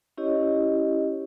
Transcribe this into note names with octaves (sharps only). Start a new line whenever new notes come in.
C#4 E4 G4 C#5 D#5